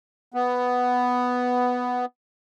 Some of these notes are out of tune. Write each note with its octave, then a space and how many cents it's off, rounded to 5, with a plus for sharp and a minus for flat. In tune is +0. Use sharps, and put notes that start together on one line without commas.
B3 +5